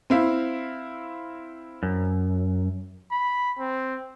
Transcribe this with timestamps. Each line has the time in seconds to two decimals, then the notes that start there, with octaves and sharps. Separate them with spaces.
0.10 C4 E4 F5
1.83 F#2
3.11 B5
3.59 C4